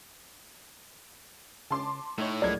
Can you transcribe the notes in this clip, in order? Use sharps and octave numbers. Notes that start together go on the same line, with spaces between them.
C#3 C#4 A5 C6 D6
A2 A3 D#4 C#5
C#2 F3 F#3 G#3 A#4 D5 G#6